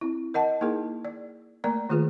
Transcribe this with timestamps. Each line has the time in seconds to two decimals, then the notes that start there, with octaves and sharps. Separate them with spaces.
0.01 C4 E4
0.34 A#4 D#5 F#5 A5
0.61 A#3 D#4 E4 G#4 A#4
1.05 D5
1.64 A3 A#3 A#4 D5 A#5
1.89 D#3 A3 F4 G#4 B4